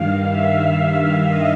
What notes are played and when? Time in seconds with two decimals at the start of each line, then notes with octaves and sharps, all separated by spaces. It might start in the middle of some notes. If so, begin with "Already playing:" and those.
Already playing: G2 D#3 F5
0.26 E5
1.23 D#5